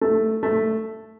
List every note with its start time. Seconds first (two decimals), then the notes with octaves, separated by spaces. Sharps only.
0.01 A3
0.43 A3